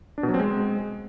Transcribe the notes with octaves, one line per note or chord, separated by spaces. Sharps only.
D4
B2
F#3
C4
G#3